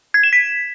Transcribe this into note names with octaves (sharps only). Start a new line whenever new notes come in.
G#6
E7
B6